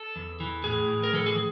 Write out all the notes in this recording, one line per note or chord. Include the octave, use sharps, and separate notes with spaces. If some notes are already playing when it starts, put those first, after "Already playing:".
Already playing: A4
E2
E3
A2 G#4
A2
A#4
E3 A4
G#4